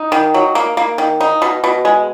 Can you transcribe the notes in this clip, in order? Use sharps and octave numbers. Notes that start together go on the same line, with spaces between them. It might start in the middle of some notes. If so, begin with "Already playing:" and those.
Already playing: D#4
D#3
F#3
A#3
A#3
D#3
D#4
B2
B2
G#3